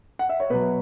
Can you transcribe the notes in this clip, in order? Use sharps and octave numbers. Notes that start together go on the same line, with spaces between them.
F#5
E5
C#5
B2 F#3 B4